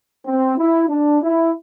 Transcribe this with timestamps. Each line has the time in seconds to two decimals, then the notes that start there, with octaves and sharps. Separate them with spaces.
0.26 C4
0.58 E4
0.89 D4
1.22 E4